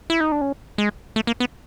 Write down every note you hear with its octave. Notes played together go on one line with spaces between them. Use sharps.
E4
D#4
D4
C#4
G#3
A3
A#3
B3